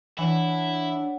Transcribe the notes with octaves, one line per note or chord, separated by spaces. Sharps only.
E3 D4 E4 C#5 F#5